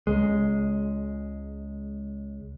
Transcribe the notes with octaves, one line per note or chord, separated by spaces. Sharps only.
C#2 G#3